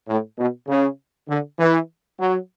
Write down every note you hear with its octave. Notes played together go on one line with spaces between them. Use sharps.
A2
B2
C#3
D3
E3
F#3